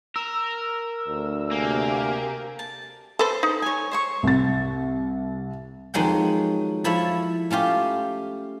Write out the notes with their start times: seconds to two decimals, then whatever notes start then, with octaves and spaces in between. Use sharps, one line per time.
0.16 A#4 E6
1.08 D2
1.51 C3 A#3 G4 G#4
2.59 A5
3.19 A4 B4 C5
3.43 D#4
3.62 C#5 G#5
3.92 C5 C#5 C#6
4.23 C2 A6
5.94 F2 D#3 F#3 G#3 F#5 G5
6.84 F3 E4 A4 C#5 E5
7.50 A3 C#4 F4 G4